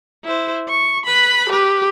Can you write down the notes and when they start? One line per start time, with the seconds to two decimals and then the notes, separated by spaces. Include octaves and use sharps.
0.24 E4 C5
0.69 C#6
1.06 B4 B5
1.49 G4 B4